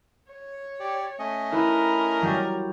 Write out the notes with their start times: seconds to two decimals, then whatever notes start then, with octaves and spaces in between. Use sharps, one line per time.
0.31 C#5
0.80 G4 D5
1.19 A3 C#4 D#5
1.52 E4 A#4 B4 B5
2.22 F#3 G3